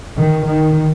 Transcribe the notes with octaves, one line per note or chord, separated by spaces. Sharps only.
D#3
D#3